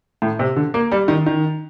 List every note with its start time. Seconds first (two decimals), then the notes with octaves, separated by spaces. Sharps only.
0.22 A2
0.39 C3
0.56 D3
0.74 A#3
0.91 G3
1.08 D#3
1.26 D#3